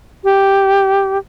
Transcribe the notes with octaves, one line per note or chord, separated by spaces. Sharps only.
G4